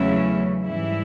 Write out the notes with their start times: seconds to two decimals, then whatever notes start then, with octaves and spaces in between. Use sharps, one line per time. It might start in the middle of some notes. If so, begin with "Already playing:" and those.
Already playing: E2 C#3 F#3 A3 C#4 E4
0.63 G#2 E3 G3 E4